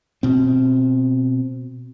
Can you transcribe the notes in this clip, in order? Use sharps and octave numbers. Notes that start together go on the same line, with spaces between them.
B2 C4